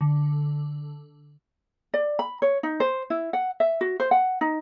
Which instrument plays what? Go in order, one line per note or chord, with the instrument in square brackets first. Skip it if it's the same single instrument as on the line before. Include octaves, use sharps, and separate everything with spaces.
[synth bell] D3
[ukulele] D5
B5
C#5
D#4
C5
E4
F#5
E5
F#4
C5
F#5
D#4